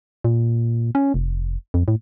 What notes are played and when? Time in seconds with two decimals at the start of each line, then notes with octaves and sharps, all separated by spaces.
0.24 A#2
0.95 C#4
1.14 F1
1.74 F2
1.88 A2